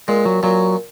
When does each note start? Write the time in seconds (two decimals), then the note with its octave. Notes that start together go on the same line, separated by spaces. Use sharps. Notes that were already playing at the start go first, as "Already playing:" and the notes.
0.08 A#2 G#3
0.26 F#3
0.43 A#2 F#3